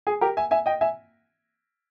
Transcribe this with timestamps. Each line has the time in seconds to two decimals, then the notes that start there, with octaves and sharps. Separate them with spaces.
0.07 G#4
0.21 G4 A#4
0.37 E5 G#5
0.51 E5 G#5
0.66 D#5 G5
0.81 E5 G#5